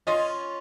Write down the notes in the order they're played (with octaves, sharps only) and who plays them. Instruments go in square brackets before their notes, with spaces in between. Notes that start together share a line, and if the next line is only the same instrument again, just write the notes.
[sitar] C#4 F4 [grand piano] D#5